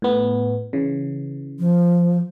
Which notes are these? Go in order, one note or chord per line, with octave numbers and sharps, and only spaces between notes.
A2 B3
C#3 E3
F3